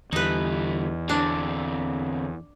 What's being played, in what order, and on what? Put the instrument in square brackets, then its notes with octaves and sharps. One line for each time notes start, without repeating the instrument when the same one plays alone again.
[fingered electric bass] E2 [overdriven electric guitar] D3 G3 [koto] D#4 B4
[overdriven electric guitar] D3 C4 [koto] D4